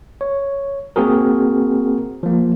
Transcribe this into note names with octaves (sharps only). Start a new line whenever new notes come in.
C#5
A#3 C4 F#4 G#4 A#4
F3 A#3